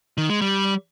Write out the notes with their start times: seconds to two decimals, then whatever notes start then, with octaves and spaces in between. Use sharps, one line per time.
0.18 D#3
0.30 G#3
0.41 G3